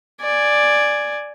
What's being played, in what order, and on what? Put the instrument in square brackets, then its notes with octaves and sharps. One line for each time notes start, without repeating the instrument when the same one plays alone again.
[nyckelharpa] D5 G#5